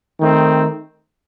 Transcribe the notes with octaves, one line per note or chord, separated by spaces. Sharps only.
D#3 A3 C4